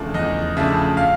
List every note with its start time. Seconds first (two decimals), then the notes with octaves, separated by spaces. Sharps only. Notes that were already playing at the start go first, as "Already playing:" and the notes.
Already playing: E2 C#3 F3 A3 D4
0.14 E2 D#5
0.57 C#3 F3 A3 D4 E5
0.97 F5